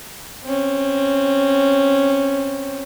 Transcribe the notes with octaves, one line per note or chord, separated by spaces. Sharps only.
C4 C#4